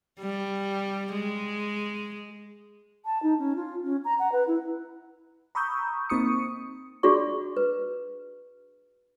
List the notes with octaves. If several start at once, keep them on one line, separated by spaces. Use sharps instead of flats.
G3
G#3
A5
D#4
C#4
F4
C#4
A#5
F#5
B4
E4
A#5 B5 C#6 D#6 E6 G6
A#3 C4 D#4 C#6 D#6 C#7
D4 F4 F#4 G#4 D5 C#6
B4